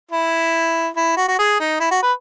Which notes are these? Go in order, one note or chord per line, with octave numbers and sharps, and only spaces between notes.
E4
E4
F#4
F#4
G#4
D#4
E4
F#4
B4